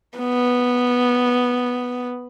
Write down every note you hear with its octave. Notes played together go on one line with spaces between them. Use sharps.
B3